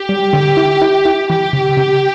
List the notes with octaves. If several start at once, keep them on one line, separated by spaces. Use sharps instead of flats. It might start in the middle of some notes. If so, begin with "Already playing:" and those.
Already playing: G4
G3
D3
E4
E4
E4
E3 G4
C#3
C#3